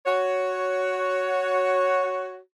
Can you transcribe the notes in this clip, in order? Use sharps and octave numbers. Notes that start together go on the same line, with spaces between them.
F#4 C#5